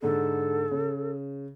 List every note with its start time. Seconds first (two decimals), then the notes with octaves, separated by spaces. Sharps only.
0.02 G#2 D3 A4
0.71 C#3